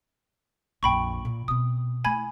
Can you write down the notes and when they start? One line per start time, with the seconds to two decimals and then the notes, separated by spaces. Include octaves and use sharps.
0.83 A#1 F2 G5 B5 C#6
1.25 A#2
1.48 B2 C4 D#6
2.04 A3 E4 G#5 B5 G#6